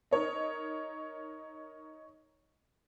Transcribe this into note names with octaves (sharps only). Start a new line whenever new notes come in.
D#4 A#4 C#5 D#5